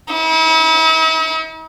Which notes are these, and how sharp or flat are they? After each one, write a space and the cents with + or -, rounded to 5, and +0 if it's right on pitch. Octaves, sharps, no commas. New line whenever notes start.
E4 -45